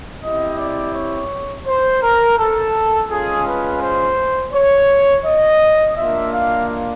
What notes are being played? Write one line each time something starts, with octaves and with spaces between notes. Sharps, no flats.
C4 E4 G4 D#5
D5
C#5
C5
A#4
A4
G#3 C#4 F4 G#4
B4
C5
C#5
D#5
A#3 D4 F4 E5
F5